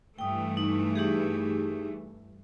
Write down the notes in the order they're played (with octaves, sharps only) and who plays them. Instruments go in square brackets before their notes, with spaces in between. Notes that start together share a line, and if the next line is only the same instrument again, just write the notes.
[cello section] G2 E3 A3 [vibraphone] G5 D#6
[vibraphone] D#4
D#4 G4 G#4